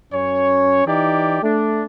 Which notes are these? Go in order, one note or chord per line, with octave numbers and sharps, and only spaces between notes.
F#2 C#4 C#5
E3 D#4 G4 D5
A3 D4